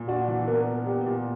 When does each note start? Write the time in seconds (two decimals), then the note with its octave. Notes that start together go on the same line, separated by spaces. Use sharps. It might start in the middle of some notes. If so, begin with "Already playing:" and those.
Already playing: A#2
0.08 D4 F#4
0.28 E3
0.48 B3 A#4
0.67 A#4
0.86 B3 G4
1.06 A#2